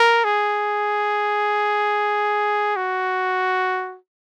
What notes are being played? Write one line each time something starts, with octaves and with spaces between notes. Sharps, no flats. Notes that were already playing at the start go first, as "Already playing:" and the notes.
Already playing: A#4
G#4
F#4